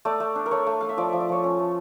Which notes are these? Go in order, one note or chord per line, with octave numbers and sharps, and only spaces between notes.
A3 D5
A3
D4
A#4
A3 C#5
A3
A3 F5
E5
F3 D5
F3 E5
D5
F3 C#5
C#4
A3